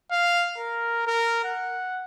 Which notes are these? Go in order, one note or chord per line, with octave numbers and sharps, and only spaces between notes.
F5
A#4
A#4
F#5